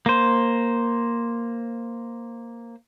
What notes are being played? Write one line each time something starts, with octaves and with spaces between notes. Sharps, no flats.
A#3 C5